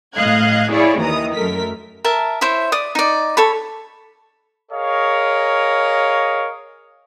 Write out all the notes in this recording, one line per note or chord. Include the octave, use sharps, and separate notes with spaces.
A2 D#5 F5 F#6 G#6
E4 G#4 C#5 D5 F5
D#2 D#3 E3 A#5 D#6
F#2 A3 A#4 B6
A#4 E5 A5
E4 C5 C#5 E5
D5 D#6
D#4 D5
A4 C#5 B5
G#4 A#4 C#5 D#5 F5